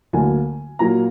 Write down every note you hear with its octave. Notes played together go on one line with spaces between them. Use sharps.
D2 D3 F#3 A#3 G#5
A#2 F#3 A#3 A#5